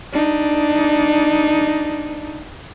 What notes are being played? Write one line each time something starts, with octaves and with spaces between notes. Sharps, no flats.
D4 D#4